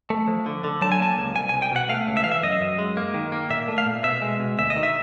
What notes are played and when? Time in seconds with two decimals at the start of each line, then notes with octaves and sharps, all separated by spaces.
0.10 A3
0.28 F3
0.46 D3
0.64 D3
0.81 F#3 A5
0.92 G#5
1.00 A#3 A5
1.17 C#2
1.35 C2 G#5
1.49 G#5
1.54 C2
1.62 G5
1.72 B2 F#5
1.89 A3 F5
2.07 C#2
2.17 E5
2.24 E3 F5
2.32 E5
2.43 F#2 D#5
2.60 F#2
2.79 G#3
2.97 A#3
3.14 D#3
3.32 A#3
3.50 A#2 E5
3.68 A3
3.78 F5
3.87 A#2
4.04 B2 E5
4.22 G#3
4.40 B2
4.58 D2 E5
4.70 D#5
4.76 D#3
4.83 E5